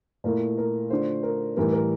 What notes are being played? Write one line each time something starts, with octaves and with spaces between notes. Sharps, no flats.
A#2 A3 E4 A#4
A#4
D3 A3 D4 F4 C5
A#4
A2 E3 G3 A#4
A#4